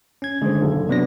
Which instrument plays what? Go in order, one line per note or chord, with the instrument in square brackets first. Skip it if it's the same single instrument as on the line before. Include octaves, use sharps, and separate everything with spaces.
[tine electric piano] C#4 G#6
[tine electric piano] D3 D#3 [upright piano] G#3 C5
[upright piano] F#1 B1 A4
[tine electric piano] C3 F#3 A#6 [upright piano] B3 D4